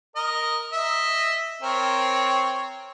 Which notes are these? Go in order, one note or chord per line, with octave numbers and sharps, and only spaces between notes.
A#4 D#5
D#5 E5
C4 A#4 C#5